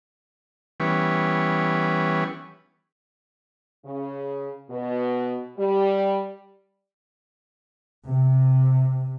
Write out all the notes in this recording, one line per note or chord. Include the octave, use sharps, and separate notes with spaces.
E3 G3 B3 C#4
C#3
B2
G3
C3